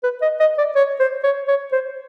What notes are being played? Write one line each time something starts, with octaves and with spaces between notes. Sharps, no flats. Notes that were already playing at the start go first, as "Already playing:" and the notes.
B4
D#5
D#5
D5
C#5
C5
C#5
C#5
C5